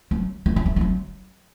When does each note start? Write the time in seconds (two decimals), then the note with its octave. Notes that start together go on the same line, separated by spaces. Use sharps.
0.11 F#3
0.46 A3
0.56 F#3
0.66 A3
0.76 A3
0.81 F#3